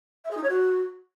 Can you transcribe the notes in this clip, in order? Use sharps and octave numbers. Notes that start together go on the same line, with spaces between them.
E5
G#4
D#4
C#5
F#4